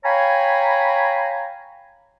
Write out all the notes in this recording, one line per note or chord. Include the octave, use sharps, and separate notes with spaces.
C#5 F5 G5 G#5 A#5 B5